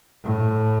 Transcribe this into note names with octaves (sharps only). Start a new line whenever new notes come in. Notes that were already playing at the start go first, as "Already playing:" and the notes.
A2